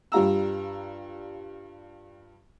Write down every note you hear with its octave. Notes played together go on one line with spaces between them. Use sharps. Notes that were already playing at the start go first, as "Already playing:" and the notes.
G2 G3 F4 A#5 E6